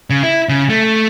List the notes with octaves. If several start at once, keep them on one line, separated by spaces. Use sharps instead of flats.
C#3
E4
C#3
A3